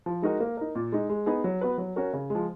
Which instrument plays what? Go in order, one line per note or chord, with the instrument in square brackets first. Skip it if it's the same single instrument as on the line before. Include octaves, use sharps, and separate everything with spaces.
[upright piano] F3
G#3 D#4 F#4 A#4
A#3
D#4 A#4
A#2
G#3 D#4
G#3
B3 D#4 G#4
F#3
B3 F#4 B4
F#3
C#4 F#4 A#4
C#3
F3 G#3